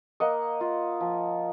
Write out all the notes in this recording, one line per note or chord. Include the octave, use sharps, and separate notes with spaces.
A#3 D#5 F#5
F4
F3